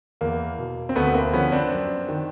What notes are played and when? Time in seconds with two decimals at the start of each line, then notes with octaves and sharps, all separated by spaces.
0.21 E2 A#3
0.58 B2
0.89 C4
0.96 D2 A3 B3
1.14 A#3 C4
1.33 D3 F3 B3 C#4
1.52 C4 D4
1.71 F#2
2.08 D#3